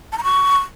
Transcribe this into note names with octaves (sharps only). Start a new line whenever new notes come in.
A5
A#5
C#6